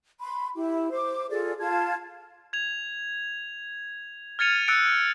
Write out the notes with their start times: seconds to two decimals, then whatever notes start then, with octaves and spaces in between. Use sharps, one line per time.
0.19 B5 C6
0.54 E4 G4
0.92 C5 D6
1.30 F4 G#4 A4 D5
1.59 F4 A5 G#6
2.53 G#6 F7
4.39 F6 G#6 A6 C#7 D#7 F7
4.68 E6 F#6 A6 C#7 D7